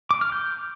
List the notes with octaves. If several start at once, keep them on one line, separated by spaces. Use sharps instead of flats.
D6
F6
G6